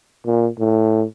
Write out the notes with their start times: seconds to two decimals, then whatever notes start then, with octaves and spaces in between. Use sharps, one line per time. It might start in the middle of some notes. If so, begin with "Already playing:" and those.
0.26 A#2
0.59 A2